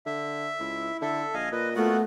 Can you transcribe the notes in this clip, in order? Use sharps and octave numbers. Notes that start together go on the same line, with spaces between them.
D3 E5
C#2 E4
D3 A4 E5
A#1 D#5 F5 G#5
A#2 B4 D#5
A3 B3 F4 F#4 F#5